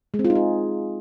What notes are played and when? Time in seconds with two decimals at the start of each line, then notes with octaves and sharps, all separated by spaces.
0.14 G#3
0.19 C4
0.25 F4
0.30 D#4
0.35 G#4